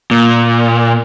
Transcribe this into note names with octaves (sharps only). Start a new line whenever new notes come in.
A#2